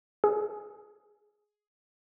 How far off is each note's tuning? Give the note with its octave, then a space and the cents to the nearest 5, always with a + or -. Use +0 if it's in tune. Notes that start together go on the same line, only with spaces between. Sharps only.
G#4 +10